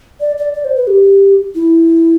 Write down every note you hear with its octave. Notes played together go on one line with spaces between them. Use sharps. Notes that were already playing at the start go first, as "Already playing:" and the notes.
D5
D5
D5
C5
B4
G4
E4